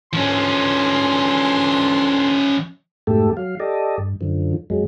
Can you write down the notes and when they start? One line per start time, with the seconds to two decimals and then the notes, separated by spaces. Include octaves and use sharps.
0.13 D3 E3 F3 C#4 C6
3.07 F2 G#2 B2 A3 G4 A4
3.37 F#3 F5
3.60 G4 A4 D5 D#5
3.97 G2
4.21 F#2 D3 F3
4.70 F2 F#3 G#3